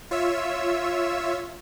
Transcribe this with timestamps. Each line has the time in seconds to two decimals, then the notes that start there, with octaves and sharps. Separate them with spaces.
0.11 F4 C#5 E5 E6